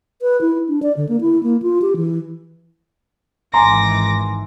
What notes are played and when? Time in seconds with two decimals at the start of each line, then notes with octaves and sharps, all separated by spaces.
0.22 B4
0.41 E4
0.68 D4
0.83 D5
0.97 D3
1.09 A#3
1.21 E4
1.43 A#3
1.62 F4
1.82 G4
1.96 E3
3.54 G#1 E3 G#5 A#5 C6 D6 A#6